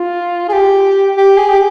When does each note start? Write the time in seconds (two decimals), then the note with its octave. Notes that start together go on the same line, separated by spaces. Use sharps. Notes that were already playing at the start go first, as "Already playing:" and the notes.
Already playing: F4
0.49 G#4
0.53 G4
1.17 G4
1.37 G#4
1.49 G4